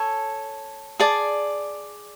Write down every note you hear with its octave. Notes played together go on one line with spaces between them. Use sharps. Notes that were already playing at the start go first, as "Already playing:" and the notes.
Already playing: A4 C#5 G#5
G#4 D5 A5